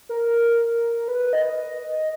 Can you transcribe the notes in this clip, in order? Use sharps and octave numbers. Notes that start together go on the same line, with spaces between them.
A#4
B4
D#5